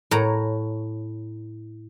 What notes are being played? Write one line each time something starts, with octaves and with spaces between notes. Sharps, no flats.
A2 C#5 A#5